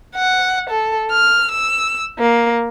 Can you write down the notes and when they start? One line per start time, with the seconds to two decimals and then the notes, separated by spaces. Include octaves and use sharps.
0.15 F#5
0.70 A4
1.12 F6
1.51 E6
2.19 A#3